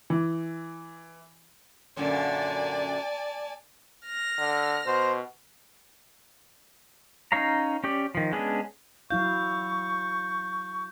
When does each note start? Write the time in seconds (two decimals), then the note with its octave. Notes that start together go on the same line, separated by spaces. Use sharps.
0.10 E3
1.97 F#2 A#2 D3 D5 G#5 A5
4.05 F6 A#6
4.39 D3
4.86 B2 C5
7.32 C#4 D#4 C#5 F5 A#5
7.84 C#4 G4 D5
8.15 D#3 F3
8.32 G#3 B3 C#4 D4 G#4
9.10 F#3 E4 F5 C#6 G6